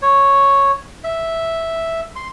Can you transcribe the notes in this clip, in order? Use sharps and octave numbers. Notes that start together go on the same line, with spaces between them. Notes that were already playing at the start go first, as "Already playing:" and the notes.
C#5
E5
C6